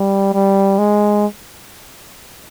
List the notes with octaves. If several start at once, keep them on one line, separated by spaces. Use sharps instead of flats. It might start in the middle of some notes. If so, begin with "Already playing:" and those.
Already playing: G3
G3
G#3